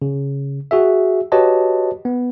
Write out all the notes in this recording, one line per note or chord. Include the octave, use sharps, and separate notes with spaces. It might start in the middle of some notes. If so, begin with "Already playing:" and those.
C#3
F#4 G#4 E5
F#4 G4 B4 C#5 D#5 A5
B3